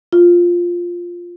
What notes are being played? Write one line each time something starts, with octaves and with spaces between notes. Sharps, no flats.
F4